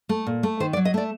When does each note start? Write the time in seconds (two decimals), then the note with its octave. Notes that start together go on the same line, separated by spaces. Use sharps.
0.09 A3
0.27 A#2
0.43 A3
0.60 D#3 C5
0.73 D5
0.77 F#3
0.85 D#5
0.94 A3 D5